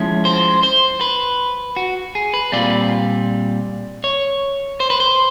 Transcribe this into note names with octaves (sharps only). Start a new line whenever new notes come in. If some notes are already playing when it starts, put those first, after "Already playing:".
Already playing: F3 G#3 C#4 E4
C5
C5
B4
F#4
G#4
B4
A#2 G3 C4 F4 D5
C#5
C5
B4
C5